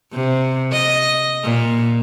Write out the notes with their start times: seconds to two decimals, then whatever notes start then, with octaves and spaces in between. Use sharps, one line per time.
0.13 C3
0.72 D#5
1.43 A#2